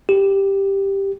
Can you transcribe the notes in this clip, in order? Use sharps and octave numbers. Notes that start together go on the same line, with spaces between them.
G4